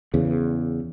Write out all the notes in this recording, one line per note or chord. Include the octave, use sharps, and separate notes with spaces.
E2 C#3